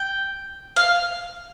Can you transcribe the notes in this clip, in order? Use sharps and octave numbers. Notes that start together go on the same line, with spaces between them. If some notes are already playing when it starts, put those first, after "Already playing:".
Already playing: G5
F5